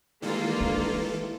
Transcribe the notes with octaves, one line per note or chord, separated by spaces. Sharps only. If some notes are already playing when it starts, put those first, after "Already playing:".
D#3 E3 G3 G#3 A#3 B3 F4 A4
D4